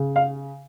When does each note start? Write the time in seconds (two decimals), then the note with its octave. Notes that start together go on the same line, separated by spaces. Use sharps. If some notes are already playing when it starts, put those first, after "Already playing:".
Already playing: C#3
0.16 F5